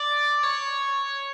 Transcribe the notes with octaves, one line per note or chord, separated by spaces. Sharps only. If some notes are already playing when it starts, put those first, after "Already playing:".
Already playing: D5
C#5